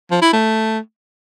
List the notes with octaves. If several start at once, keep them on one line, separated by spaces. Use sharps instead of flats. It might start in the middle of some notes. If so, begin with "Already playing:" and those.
F3
E4
A3